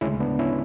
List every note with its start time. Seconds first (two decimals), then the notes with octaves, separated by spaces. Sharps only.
0.01 D2 C#3 G#3 C#4 E4
0.20 B3 D4
0.39 C#4 E4